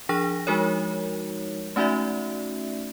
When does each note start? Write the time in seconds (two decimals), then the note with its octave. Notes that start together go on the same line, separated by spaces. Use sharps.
0.09 F3 D4 G#4 A#6
0.47 F3 G#3 D#4 F#4 A#4 C#5
1.76 A3 C#4 D#4 F#4 D5 E5